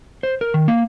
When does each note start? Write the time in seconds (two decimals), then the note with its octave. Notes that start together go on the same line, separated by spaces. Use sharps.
0.23 C5
0.41 A#4
0.54 D#3
0.68 A#3